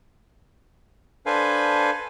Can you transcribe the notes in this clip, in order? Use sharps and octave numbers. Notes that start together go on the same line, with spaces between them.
D4 A4 B4 C5 F5 G#5